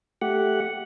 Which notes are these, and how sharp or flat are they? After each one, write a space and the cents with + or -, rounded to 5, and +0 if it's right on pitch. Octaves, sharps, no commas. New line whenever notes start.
A3 -10 G4 -10 F#5 +0